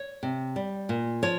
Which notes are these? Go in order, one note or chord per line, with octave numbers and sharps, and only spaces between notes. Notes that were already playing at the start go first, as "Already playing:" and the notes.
Already playing: C#5
C3
G3
A#2
F3 C#5